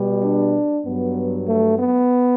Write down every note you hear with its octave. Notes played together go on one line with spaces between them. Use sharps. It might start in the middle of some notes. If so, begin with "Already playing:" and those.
Already playing: B2 G3
D4
G2 F#3 B3
A3
B3